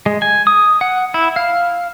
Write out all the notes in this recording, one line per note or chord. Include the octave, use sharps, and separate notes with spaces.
G#3
G#5
D#6
F#5
E4
F5